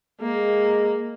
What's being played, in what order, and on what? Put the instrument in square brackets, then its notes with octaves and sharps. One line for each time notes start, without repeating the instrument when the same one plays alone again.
[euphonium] G#3 [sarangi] A#3